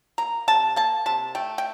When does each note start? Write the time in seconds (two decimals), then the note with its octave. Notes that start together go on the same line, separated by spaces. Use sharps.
0.18 A#3 A#5
0.48 C3 A5
0.76 A#3 A5
1.06 C3 A5
1.35 A3 G5
1.58 G5